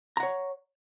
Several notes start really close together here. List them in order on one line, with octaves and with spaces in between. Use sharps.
A#5 F#5 C#5